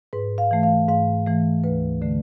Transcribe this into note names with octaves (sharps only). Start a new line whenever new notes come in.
G#2 B4
F5
E3 A3
F5
G#2 F5
E3 A3
D2 B4
D3 A3